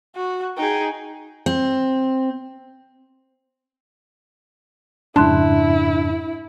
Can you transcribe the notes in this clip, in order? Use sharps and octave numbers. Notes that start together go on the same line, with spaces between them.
F#4
D#4 G#4 G5
C4
F2 G#2 C#3 D4 E4 A5 C6 F#6